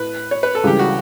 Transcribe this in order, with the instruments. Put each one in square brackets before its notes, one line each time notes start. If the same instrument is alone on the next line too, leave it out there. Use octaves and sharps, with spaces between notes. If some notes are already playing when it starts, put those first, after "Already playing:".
Already playing: [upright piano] A2 A3 [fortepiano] B4
[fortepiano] C#5
B4
A4
[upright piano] C#2 C#3 E3 G3 [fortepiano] G4
[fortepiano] F#4